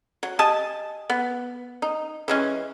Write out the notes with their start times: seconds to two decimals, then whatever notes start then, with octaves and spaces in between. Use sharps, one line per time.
0.23 F#3
0.39 G4 D#5 G#5 A5
1.10 B3
1.82 D#4
2.28 E3 G#3 C#4